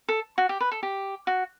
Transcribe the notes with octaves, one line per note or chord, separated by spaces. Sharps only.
A4
F#4
G4
B4
A4
G4
F#4